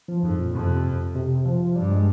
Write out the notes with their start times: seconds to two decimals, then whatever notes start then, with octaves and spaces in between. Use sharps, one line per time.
0.08 F3
0.23 F2 G#2
0.39 A#2
0.54 F2 C3
1.15 C3
1.45 F3
1.76 G2 G3
1.91 G#3